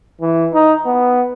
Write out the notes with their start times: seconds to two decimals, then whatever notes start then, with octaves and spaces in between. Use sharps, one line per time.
0.21 E3
0.54 D#4
0.86 B3